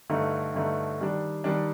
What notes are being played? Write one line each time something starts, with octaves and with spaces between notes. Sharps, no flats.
G2 D3 A3 D#4
G2 D3 A3 D#4
D#3 G3 D4
D#3 G3 D4